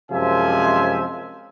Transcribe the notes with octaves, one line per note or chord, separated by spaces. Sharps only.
F#2 C3 F3 G#3 E5 G#5